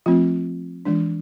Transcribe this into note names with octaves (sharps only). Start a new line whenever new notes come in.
F3 A3 C4 F4
E3 G#3 D4